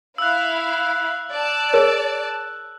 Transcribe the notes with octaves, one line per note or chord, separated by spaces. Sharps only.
E4 F5 E6 F#6
D5 A5
G#4 A#4 C#5